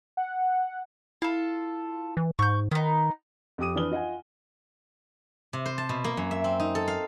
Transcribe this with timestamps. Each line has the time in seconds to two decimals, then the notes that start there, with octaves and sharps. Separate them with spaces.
0.17 F#5
1.22 E4 F4 A4
2.17 E3
2.39 G#2 C#6 G6
2.71 D#3 B3 D#4
3.58 F2 G4 D6 D#6 D#7
3.75 E3 D4 B4 D#6 F6 G7
3.91 F4 D#5 F#5 G#5
5.53 C3
5.66 C5
5.78 A5
5.89 B2
6.04 A#3
6.17 F#2
6.31 E5
6.44 C4
6.60 D#4
6.75 A4
6.88 F5